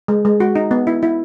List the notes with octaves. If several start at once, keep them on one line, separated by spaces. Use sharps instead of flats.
G#3
G#3
F#4
D#4
B3
E4
E4